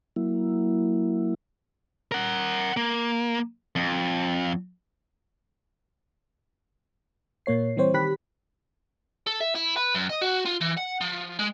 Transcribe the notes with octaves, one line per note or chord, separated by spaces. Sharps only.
F#3 A#3 E4
A#4 F#5
A#3
F2
A#2 A#3 C#5 C7
E3 G3 C4 C5 C#5
D#3 G4 B5 F#6 B6
A4
E5
E4
B4
F#2
D#5
F#4
F4
E3
F#5
F3
G#3